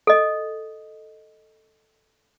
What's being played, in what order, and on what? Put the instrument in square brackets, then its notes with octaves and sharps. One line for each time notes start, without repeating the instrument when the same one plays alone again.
[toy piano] A4 D#5